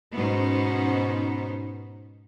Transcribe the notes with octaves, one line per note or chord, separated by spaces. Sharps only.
G#2 B2 B3 C#4 D#4 C5